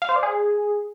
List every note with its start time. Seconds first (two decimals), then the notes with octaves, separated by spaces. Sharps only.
0.02 F5
0.09 C5
0.16 D5
0.23 G#4